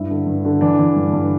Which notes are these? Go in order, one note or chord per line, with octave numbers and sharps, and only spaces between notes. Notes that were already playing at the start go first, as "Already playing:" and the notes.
Already playing: G2 E4
D3
G2
D3
E3 D4
E3
G2
G2